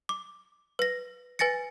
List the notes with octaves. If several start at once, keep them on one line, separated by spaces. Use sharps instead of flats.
D6
B4 A#6
B4 G#5 A6 A#6 C#7